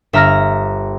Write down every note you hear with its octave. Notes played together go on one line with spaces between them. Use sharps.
G1 E5 A#5 F6 A#6